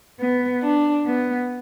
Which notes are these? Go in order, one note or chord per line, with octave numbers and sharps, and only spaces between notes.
B3
D4
B3